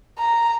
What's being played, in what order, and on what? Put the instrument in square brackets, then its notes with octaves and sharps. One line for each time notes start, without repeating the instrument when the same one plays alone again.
[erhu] A#5